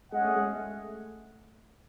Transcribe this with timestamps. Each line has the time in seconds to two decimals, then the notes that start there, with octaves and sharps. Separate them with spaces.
0.12 G#3 C#4 G#4 D#5 F#5
0.24 A3
0.36 G#3
0.53 A3